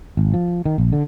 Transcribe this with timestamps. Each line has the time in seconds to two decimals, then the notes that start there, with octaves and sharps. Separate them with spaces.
0.17 G#1
0.34 F3
0.66 D#3
0.78 A#1
0.93 D3